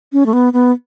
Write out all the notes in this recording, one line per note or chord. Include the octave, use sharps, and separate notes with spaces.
C#4
A3
B3
B3